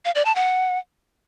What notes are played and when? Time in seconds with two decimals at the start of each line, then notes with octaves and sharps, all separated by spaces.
0.05 F5
0.15 D5
0.25 A5
0.36 F#5